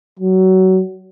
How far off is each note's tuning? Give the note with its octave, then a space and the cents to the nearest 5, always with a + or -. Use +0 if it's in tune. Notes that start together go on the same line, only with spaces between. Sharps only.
F#3 +20